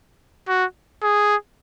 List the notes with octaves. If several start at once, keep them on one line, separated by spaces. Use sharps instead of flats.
F#4
G#4